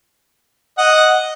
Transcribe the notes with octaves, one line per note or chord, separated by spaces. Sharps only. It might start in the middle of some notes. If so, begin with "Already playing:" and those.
D#5 F#5